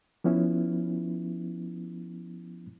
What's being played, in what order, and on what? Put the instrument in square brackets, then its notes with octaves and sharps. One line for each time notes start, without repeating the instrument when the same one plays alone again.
[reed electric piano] F3 B3 C#4 E4